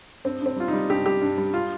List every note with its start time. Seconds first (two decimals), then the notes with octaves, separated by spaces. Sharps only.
0.24 G2 C4
0.41 G2 C4
0.56 G3 F4
0.68 G3 D#4
0.90 G2 G4
1.06 G3 G4
1.21 G2
1.38 G3
1.54 F4